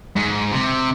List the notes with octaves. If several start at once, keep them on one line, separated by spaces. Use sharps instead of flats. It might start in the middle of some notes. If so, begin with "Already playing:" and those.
G#2
C3